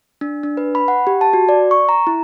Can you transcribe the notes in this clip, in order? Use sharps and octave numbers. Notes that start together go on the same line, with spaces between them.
D4
D4
B4
B5
F#5
G4
A5
F#4
D5
C#6
A#5
E4